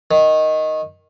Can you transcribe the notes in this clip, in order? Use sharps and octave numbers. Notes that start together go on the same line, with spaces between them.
D#3